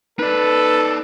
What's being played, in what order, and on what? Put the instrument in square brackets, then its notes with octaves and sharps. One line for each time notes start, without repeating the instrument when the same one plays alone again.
[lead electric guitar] D#4 D5 [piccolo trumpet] A4 [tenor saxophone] B4